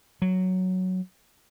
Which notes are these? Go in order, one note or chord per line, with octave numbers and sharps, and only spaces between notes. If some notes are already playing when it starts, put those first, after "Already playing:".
F#3